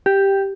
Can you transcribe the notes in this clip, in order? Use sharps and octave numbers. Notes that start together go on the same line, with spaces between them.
G4